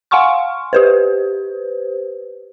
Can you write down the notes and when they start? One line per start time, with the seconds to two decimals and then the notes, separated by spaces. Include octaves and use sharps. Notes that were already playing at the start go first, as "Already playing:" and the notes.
0.11 F5 F#5 G#5 C6 C#6 F6
0.73 G4 B4 C5